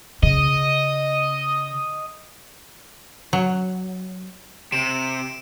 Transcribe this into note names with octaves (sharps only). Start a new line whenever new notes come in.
C#3 D#5
F#3
C3 D7 E7